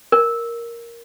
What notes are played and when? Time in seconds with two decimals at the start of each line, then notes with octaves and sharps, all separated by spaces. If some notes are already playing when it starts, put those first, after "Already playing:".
0.12 A#4